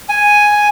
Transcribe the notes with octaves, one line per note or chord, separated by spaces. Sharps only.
G#5